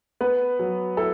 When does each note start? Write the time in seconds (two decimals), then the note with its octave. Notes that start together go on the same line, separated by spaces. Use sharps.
0.21 B3 B4
0.59 F#3
0.97 E4 A4